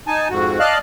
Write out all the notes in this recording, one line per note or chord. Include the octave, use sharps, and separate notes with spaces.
D#4 G#5 A5
F2 G#2 F#4
D5 D#5 F5 A5 F6 F#6